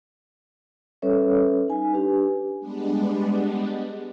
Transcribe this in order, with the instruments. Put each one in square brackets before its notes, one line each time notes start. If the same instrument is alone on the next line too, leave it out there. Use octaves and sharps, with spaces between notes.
[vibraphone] G3 C#4 A4 B4 C#5 E5
D#4 G#5
D4 G4 B4
[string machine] G3 G#3 B3 D4